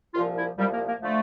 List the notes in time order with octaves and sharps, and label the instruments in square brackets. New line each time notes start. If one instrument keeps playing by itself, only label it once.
[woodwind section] C2 A#2 F3 F4
E4
C2 A#2 F3 G3
A#3
A#3
D3 F3 A3